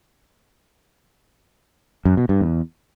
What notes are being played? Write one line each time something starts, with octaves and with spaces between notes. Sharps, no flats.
F#2
B2
G2
E2